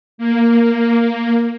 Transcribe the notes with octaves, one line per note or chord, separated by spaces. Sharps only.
A#3